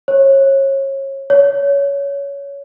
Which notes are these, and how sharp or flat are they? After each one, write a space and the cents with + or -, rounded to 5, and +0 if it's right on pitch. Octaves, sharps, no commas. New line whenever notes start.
C#5 -30
C#5 +20